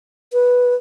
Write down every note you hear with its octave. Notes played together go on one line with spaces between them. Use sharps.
B4